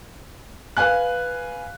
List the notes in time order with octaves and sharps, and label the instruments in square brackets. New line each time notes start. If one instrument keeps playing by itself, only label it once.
[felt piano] B4 F5 G#5 F#6